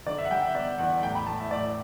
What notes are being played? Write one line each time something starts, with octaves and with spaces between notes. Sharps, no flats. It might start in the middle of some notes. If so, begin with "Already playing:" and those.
D3 D5
E5
F#5
G3 G5
E5
B3 D5
E2 F#5
A2 G5
B5
A2 A5
E5
A2 D5